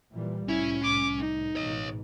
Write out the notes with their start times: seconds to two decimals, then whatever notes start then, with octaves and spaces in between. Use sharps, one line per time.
0.12 A#2 E3 G3
0.48 C2 A2 C#4 E4
0.83 D6
1.19 D#4
1.56 A1 G#2 B2 C#5 D#5